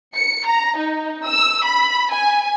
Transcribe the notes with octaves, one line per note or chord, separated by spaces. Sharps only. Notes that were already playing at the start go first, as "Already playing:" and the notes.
C#7
A#5
D#4
E6
B5
G#5